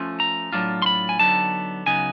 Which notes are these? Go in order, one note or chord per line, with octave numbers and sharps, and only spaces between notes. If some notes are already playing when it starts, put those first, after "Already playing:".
Already playing: F3 A3 C#4 F4
A#5
A2 F#3 A3 D4 F4
C6
B5
G#5
D3 F#3 B3 D#4 A5
C#3 F#3 B3 D#4 G#5